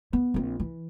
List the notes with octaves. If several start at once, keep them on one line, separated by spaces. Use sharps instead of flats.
B3
A#1 C4
E3